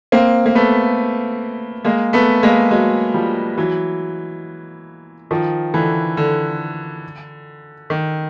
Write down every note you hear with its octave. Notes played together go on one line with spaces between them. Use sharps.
A#3 C4
A#3
A3 B3
G#3 A#3
A3 B3
G#3 A#3
F#3 G#3
F3 G3
E3 F#3
D#3 F3
D3 E3
D3
D#3